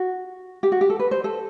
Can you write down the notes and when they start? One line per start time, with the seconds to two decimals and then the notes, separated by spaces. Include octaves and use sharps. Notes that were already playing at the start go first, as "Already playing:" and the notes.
Already playing: F#4
0.63 G4
0.72 F#4
0.81 G4
0.90 A4
0.99 B4
1.11 C5
1.24 A4